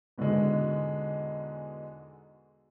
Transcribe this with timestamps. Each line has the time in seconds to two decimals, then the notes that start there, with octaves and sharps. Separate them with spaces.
0.18 E2 G#2 B2 D3 G#3